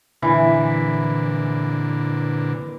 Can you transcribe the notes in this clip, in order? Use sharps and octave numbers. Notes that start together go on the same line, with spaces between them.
A#2 D3 E3